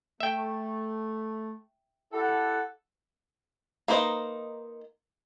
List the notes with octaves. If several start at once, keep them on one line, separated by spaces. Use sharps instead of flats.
A3 E5 G5
E4 G4 A4 F#5
A#3 D#4 B4 C5 D#5